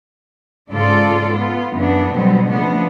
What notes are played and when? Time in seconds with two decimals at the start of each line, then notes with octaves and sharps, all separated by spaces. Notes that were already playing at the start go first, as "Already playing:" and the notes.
0.71 G#2 C#3 F4 A4 D5
1.32 B3 F4
1.74 F#2 C#3 E3 B3 D4
2.15 B2 D3 F#3 G3 B3 C4
2.50 C#3 F3 A3 B3 D4